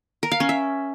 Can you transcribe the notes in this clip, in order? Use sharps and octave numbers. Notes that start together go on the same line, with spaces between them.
A#4
F5
C#4
E5